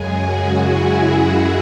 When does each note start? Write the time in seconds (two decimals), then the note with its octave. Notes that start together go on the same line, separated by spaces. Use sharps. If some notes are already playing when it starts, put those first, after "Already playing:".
Already playing: F#2 C#3 G#3 G#4
0.19 F#4
0.62 E4
1.06 F#4